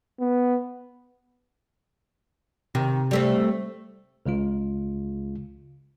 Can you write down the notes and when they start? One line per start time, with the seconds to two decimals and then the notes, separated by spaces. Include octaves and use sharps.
0.20 B3
2.75 C3 D#3
3.11 G3 A3 C4
4.26 C#2 C#3 G#3 F4